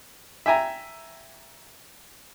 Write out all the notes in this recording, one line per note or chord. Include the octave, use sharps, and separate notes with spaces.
E5 G5 G#5 A#5